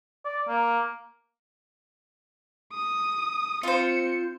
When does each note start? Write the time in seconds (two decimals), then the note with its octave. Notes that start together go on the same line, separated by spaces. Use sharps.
0.25 D5
0.48 A#3
2.73 D#6
3.63 C4 F4 C5 C#7